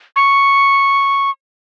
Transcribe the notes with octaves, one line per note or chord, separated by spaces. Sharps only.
C#6